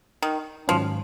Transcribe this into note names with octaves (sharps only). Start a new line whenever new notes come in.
D#3
G#2 D#3 F3 F#3 C#4